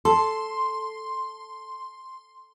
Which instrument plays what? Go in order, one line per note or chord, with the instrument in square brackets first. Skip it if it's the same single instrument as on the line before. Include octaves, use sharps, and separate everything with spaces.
[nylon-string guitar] A4 [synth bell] C6